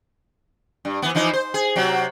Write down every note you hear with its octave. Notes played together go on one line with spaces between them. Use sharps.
G2
E3 B3
E3 F3 D#4
C5
G#4
C3 F#3